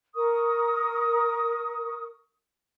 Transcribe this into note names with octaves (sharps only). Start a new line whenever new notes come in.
A#4 C#6 D#6